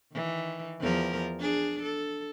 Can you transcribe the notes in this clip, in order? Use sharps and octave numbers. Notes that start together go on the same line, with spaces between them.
D#3 E3
E2 F3 A#4
D4 G#4
A4